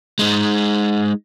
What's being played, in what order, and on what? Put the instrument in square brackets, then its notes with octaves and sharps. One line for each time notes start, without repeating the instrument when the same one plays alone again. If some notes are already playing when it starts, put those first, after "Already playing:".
[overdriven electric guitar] G#3 D#4